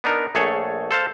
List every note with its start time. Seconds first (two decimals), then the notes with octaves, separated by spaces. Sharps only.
0.04 B3 D4 D#4 A#4
0.35 A#1 A3 G#4 A4 C#5
0.91 A4 C5 F5 A5